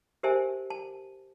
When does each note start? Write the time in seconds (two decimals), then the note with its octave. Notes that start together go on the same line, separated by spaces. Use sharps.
0.23 G4 A#4 C5 E5 G#5 A5
0.70 A5